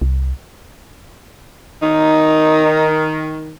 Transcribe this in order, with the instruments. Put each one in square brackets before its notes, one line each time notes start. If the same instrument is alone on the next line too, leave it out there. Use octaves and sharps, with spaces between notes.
[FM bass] C2
[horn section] D#3 [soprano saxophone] D#4